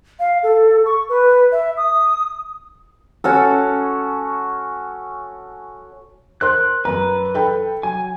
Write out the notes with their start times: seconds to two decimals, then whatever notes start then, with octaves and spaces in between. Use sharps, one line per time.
0.20 F5
0.43 A4
0.86 C#6
1.09 B4
1.52 E5
1.77 D#6
3.24 C#4 F#4 A4
6.41 A#4 C5 C6 F#6
6.85 F#2 B4 A#5
7.34 A4 G5 B5
7.83 F#3 G#5